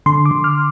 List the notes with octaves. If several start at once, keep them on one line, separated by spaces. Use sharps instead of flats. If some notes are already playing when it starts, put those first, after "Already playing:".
D3 C6
D6
D3
F6